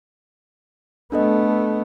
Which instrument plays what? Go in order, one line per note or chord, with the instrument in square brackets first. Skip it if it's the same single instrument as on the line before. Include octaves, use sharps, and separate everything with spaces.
[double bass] A3 B3 [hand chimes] D4 A4 D#5